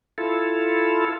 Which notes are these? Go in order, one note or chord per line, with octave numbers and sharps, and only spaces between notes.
E4 F4 A4